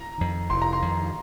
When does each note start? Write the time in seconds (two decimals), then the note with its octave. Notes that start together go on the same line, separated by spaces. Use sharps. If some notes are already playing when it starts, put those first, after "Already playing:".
Already playing: A#5
0.18 F2 D#3
0.49 F1 C6
0.62 A#5
0.73 C6
0.82 F2 D#3